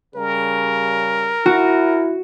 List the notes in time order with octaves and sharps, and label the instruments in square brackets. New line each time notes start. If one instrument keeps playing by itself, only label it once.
[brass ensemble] C#3 G3 [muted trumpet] A#4
[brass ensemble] E4 [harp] F#4